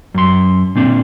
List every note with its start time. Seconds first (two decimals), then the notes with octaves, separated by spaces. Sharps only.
0.14 F#2 C6
0.75 A#2 C4 D4